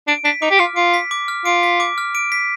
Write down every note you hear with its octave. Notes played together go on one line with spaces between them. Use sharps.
D4 D7
D4 B6
D#4 D6
G4
F4 F6
F4 D7
B6
D6
F6
F4 D7
B6
D6
F6
D7
B6